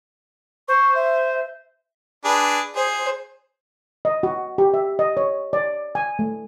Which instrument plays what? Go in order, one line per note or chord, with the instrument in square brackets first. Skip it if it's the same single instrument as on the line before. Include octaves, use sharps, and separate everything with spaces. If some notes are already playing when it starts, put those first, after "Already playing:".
[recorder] C5 [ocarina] C#6
[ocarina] E5
[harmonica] D4 G#4 B4
[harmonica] G#4 [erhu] C5
[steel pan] D#5
F#4
G4
E5
D#5
C#5
D5
G#5
A3